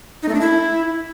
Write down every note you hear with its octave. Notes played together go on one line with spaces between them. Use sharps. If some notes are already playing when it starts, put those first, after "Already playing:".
D#4
A3
D4
E4